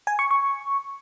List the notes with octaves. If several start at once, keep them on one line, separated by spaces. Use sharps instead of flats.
G#5
C#6
C#6